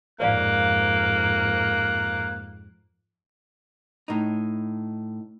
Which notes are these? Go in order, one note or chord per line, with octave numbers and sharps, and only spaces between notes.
F2 G#2 A#3 C5 D5 F5 F#6
A2 D#4